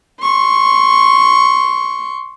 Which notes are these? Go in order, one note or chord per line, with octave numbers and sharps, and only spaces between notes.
C6 C#6